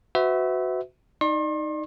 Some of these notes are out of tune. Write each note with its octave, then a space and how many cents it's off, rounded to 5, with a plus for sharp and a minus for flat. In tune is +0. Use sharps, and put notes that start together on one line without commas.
F#4 +0 B4 +40 E5 -15
D#4 +0 D5 +25 C6 +40